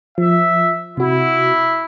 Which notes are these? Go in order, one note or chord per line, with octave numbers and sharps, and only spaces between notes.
F3 E5
C3 E4 F#4